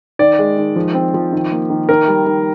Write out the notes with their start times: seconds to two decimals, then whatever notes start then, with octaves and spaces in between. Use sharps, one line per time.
0.19 D#3 D5
0.39 G#3
0.58 D#3
0.76 F3
0.94 C4
1.14 F3
1.32 D#3
1.52 A#3
1.70 D#3
1.89 D#3 A#4
2.08 G3
2.26 D#3